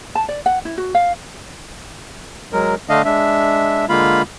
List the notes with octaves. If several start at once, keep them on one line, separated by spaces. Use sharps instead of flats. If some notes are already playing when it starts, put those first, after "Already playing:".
A5
D5
F#5
E4
F#4
F5
F#3 G#3 A#4
D3 A3 D4 D#5 F5
G#3 D4 E5
D3 G#3 A#3 F4 F5 B5